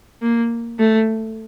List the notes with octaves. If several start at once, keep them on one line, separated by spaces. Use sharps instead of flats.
A#3
A3